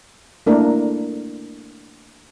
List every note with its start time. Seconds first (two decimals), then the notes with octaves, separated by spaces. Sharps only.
0.46 A3 A#3 D4 E4 A#4